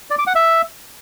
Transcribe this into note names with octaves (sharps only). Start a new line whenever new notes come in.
D5
D6
F#5
E5